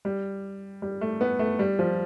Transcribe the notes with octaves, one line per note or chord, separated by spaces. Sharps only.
G3
G3
A3
B3
A3
G3
F3